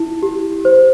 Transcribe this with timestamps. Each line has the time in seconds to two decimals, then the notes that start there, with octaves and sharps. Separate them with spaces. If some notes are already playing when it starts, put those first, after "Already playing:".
Already playing: E4
0.22 G4
0.65 C5